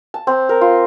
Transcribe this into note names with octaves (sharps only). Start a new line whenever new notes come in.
A5
C4
A#4
F4